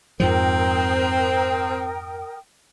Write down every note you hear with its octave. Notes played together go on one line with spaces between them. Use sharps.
F2 G#2 F3 C4 A#4 G5 D#6